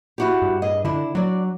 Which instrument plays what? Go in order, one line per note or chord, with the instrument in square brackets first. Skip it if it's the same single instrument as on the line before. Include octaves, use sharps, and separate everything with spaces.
[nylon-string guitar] E4 F#4 G4
[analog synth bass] G2
[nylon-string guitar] G#4 D#5
[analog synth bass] D3 [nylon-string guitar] D4 E4
[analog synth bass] F#3 [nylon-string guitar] D4 D5